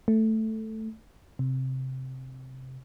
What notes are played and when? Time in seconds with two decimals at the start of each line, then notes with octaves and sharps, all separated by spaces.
0.08 A3
1.39 C3